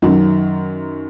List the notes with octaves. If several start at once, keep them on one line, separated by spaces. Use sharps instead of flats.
F#2 D#3 F#3